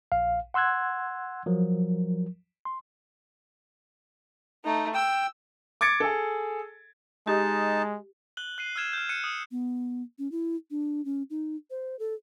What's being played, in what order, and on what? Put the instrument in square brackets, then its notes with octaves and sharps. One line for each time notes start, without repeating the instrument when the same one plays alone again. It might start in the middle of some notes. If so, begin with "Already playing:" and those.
[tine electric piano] A#1 F5
F#5 C6 E6 F#6 G#6
F3 F#3 A#4
C6
[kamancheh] A3 D#4
[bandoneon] G5 [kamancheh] E6
[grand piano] D6 G#6 A6 C#7 D7
G#4 A4
[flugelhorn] G#3 [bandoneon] D#4 A5 [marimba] G4
[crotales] F#6 F#7 G7
F#6 C7 D#7
E6 F6 G#6 E7
F6 G6
F#6 C#7 D#7
D#6
[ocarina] B3
C#4
E4
D4
C#4
D#4
C5
A4